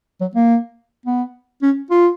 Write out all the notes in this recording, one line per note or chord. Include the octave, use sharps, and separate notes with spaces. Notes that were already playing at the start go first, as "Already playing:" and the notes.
F#3
A#3
B3
C#4
F4